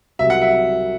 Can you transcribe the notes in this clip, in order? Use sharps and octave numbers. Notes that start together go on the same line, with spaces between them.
C2 C3 F#3 E5
F#5
E5